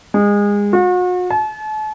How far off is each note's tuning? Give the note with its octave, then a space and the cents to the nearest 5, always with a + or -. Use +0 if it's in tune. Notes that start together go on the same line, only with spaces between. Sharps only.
G#3 -25
F#4 -40
A5 -40